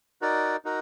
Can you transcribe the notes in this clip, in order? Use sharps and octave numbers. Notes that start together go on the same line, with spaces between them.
D#4 F#4 A#4 D5
D#4 F#4 A#4